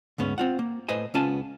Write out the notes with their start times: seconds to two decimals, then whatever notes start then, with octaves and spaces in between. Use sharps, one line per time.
0.18 D2 G#2 B3 C#4
0.38 C4 F4 F#5
0.59 A#3
0.89 A2 B4 C5 D#5 G#5
1.14 C#2 B3 C#4 F4 G#5 A5